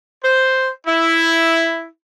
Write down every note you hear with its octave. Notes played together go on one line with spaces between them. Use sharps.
C5
E4